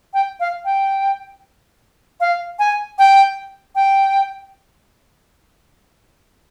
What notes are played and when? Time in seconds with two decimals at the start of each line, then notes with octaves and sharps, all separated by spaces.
0.14 G5
0.40 F5
0.65 G5
2.20 F5
2.59 G#5
2.98 G5
3.75 G5